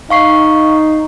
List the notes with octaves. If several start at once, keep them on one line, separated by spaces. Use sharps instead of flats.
D#4 F5 C#6 C7